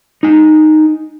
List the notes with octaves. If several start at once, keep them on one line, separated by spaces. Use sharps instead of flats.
D#4 G#5